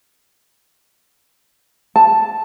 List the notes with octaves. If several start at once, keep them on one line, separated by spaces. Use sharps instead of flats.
A5